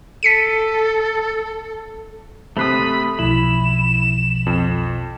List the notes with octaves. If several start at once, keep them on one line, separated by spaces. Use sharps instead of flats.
A4 B6 C#7 D#7
C3 A3 C4 C5 B5 D#6 F#6
B1 B2 F3 E4 B5 E7
F2